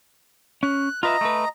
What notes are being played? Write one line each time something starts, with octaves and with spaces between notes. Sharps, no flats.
C#4 F#6
F4 B4 D#5 E5 A#5
A3 B4